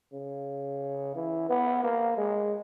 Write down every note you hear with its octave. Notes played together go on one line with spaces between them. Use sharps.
C#3
E3
B3
A#3
G#3